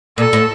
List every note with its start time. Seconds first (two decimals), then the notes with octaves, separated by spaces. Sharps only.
0.18 A#2 A4
0.33 A2